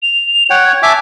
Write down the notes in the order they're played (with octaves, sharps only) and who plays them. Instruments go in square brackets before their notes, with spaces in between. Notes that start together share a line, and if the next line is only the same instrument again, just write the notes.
[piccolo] F7
[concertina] C#5 F#5 G5
[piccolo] G#6
[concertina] E5 G#5 D6 [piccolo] A5